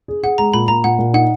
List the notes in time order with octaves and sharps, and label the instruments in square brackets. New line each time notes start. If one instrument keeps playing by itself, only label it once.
[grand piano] G#4
[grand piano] G#4 [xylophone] F#5
[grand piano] G#3 [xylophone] A#5
[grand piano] A#2 [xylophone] B5
[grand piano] A#2 [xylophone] A#5
[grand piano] A#2 [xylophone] F#5
[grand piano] A#2
[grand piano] D#4 [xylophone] F#5